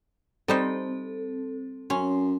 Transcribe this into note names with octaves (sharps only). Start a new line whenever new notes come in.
G3 C4 D#4 A4 C5
F#2 C#4 C6